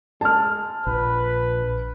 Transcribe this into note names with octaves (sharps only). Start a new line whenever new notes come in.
G#3 A5 F6
A#1 B4